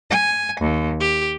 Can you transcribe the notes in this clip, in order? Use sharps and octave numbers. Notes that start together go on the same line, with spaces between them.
G#5
D#2
G4